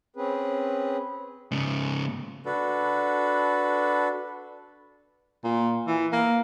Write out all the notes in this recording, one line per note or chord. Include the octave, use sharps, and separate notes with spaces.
C4 C#4 G#4 B4
G#2 C#3
D4 F#4 A4 B4
A#2
E3
A#3